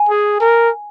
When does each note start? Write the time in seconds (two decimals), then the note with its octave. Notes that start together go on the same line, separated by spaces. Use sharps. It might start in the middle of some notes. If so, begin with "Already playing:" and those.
Already playing: G#5
0.09 G#4
0.41 A#4